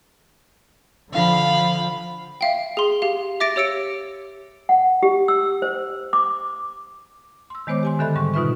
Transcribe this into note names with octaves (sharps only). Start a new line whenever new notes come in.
D3 F3 F5 B5
E5 F5 G5
G#4 C6
G4 F5
E5 D6 A6 A#6 D7
G4 C#5 E6 C#7 D7
F#5
G4
E6
C5
D6
C6 E6
D#3 G#3 B3 C5 C#5 D6
G4 G#5 C6
D3 D#3 A4 E5 B5 F#6
G#2 G3 C#6
B2 D#4 F4 B4 E5 C#6